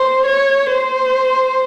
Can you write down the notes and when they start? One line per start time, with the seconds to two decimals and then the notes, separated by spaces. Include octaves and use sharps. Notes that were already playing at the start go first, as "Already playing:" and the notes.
Already playing: C5
0.26 C#5
0.71 C5